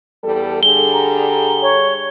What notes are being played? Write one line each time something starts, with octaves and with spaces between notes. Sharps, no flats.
E2 G3 A4
D3 G3 G#4 G7
A#5
C#5